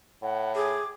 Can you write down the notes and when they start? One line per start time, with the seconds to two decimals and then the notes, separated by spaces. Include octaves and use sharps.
0.22 A2 F#5
0.56 G#4 D6